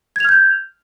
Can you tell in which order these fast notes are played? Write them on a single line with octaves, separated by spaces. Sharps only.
G#6 F7 F6 G6